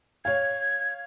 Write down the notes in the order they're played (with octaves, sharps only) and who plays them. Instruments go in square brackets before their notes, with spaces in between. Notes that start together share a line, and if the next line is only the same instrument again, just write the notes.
[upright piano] C#5 F5 [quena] G#6